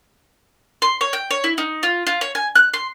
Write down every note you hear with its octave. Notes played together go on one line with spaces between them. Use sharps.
C6
C#5
G5
C#5
E4
D#4
F4
F4
C#5
G#5
F#6
C6